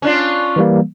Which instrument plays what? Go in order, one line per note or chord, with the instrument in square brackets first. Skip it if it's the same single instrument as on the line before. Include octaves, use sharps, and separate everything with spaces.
[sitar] C#4 D4 F4
[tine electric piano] E3 G3 A#3